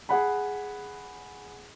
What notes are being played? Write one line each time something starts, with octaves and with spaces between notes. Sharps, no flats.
G#4 F#5 B5